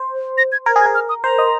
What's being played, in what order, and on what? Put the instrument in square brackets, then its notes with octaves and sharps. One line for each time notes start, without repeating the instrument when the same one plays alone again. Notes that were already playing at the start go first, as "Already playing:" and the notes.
Already playing: [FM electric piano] C5
[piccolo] A#6
G#6
[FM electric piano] A#4 [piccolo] G#6
[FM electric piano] G#4
[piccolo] G#6
[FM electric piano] A#4
[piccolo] F6
D#6
[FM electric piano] C5 [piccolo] A#5
[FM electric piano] D#5